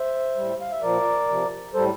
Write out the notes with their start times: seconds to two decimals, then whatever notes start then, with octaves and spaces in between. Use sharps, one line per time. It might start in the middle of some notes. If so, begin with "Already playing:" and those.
Already playing: C5 E5
0.36 A2 G3
0.61 F5
0.72 E5
0.82 A#2 F3 A#4 D5
1.28 C3 F3
1.74 A2 G3 A4 C5